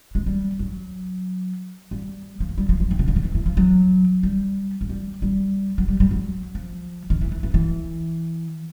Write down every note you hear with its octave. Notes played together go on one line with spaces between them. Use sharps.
G#3
G3
F#3
G3
F3
F#3
G3
F3
F3
D#3
C#3
D3
D#3
E3
E3
F3
F#3
G3
F#3
G3
G3
F#3
G3
G3
F#3
F3
D#3
E3
E3
E3
E3